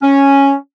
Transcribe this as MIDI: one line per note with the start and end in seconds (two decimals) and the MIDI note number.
0.02 0.53 61